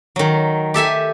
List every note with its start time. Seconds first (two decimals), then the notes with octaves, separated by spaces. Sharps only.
0.16 D#3 F#3
0.74 G4 A4 E5 G#5